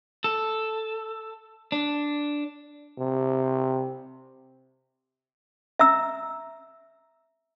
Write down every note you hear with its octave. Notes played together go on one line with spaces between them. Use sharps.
A4
D4
C3
E5 A#5 E6